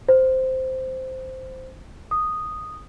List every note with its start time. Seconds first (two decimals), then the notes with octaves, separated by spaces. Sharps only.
0.09 C5
2.11 D#6